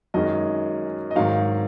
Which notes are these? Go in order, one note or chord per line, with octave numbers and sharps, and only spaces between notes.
F#2 D#3 G#3 D#5
D#5
G#2 D#3 F#3 F5